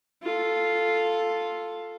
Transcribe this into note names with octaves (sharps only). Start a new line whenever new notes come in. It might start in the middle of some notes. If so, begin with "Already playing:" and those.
F4 A4